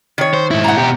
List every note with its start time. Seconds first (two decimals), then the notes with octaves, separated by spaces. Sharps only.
0.18 D#3 C#5
0.34 C5
0.51 G#2 E4
0.64 F#5 A#5
0.78 B2 G4